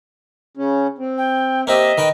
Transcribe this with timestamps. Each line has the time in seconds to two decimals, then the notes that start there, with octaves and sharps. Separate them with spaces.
0.57 C#3 C#4
0.98 C4
1.18 G5
1.67 A#3 C4 G4 D#5 E5
1.98 D#3 B4 G5